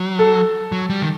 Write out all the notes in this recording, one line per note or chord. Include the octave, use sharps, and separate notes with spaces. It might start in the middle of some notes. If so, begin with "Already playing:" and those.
Already playing: F#3
A4
F#3
G3
D#3